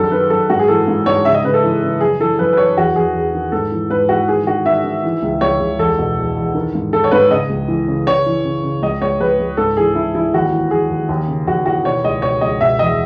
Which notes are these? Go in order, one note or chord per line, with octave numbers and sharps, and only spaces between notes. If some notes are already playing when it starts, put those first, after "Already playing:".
Already playing: F#2 D#3 A4
D#3 B4
F#2 A4
G#2 F#4
G#4
E3 A4
G#2
G#2 C#5
C#3 E5
D#5
C#3 B4
A4
E3
C#3
F#2 G#4
E3 A4
F#2 B4
B4
E3 C#5
E2 F#4
E2 G#4
E2
D#3
G#2 A4
E3
G#2 B4
E3 F#4
D#3 G#4
D#3 F#4
D#3 E5
D#3
E3
C#2
C#2 C#5
C#2
E2 A4
B2
E2
E2
D#3
G#2
D#3 A4
C#5
G#2 B4
C#3 D#5
C#2
E3
C#3
C#3 C#5
E3
C#3
C#3
C#2 D#5
C#2 C#5
C#2 B4
C#2
G#2 A4
E3 G#4
G#2 E4
E3 E4
D#2 F#4
E3
D#2 G#4
D#2
D#2
C#3
D#2 F#4
E3 F#4
B2 C#5
C#2 D#5
B2 C#5
C#2 D#5
B2 E5
E2 D#5